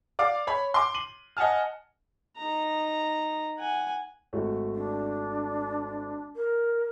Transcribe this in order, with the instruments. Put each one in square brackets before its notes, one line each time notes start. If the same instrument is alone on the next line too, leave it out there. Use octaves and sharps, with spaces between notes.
[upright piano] D5 F5 D6
C#5 B5
C6 D6
D#7 F#7
D#5 F#5 G#5 A5 F6
[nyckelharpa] D#4 A#5
F#5 G#5
[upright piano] G#1 A3 F#4
[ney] D4
A#4